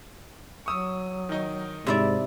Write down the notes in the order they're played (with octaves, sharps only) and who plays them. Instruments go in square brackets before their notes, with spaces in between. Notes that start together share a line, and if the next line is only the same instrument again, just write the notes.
[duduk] F#3 [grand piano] C#6 D#6 E6
[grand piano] D#3 D#4
[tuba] G#2 [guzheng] C3 E4 D5